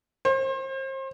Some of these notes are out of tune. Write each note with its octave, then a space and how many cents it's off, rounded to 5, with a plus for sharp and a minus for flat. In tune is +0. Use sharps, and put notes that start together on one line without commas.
C5 +35